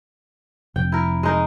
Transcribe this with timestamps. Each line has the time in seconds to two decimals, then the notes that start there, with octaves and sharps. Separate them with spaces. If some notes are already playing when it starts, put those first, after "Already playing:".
0.76 F1 G5
0.92 E4 A#4
1.23 G#3 D#4 A#4